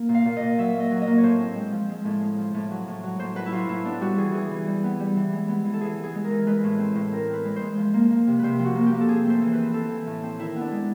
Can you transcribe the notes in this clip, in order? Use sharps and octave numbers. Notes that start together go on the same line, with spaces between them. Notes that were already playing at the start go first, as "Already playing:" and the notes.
Already playing: A#3
A#2
F5
A#2
D#5
A#2
F#3 E5
A#3
D#5
F#3
D#5
A#3
C#5
A2 C5
C4
G#3
F3
G#3
A2
G#3
F3
A2
F#3
A2
F#3
A2 C5
F#3 B4
E4
F#3 F4
A2 E4
B3 D4
G3 F#4
E3 G#4
E3 G#4
E3
G3
B3
G3
E3
G#3
B3
E3
A4
E3 G#4
E3
G#4
G#3
A#4
E3
G#3 B4
A2
C4
A2
C4 A#4
C4
B4
G#3
C5
G#3
F3
A#3
A#3
C3
C3 B4 C5
F3
F#4
A#3
G4
A#3
A4
C4 G#4
A3 C5
E3
B4
C4
C4 A4
E3
A2
C4
D#3 E4
B3 D4
G#3